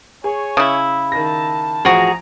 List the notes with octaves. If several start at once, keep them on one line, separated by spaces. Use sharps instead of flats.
G#4 C#5 G#5 C#6
C#3 E4
D#3 A5 A#6
A1 F3 F#4 G#4 A#5 D7